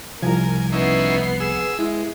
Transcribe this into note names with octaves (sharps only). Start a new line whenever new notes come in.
C2 F3 A#4 G#5
B3 C#4 D#4 E4 C7
G#4 E6
G#3 E4